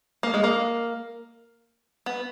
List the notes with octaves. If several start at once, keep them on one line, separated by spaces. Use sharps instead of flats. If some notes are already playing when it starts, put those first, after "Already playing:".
A#3
G#3
A#3
B3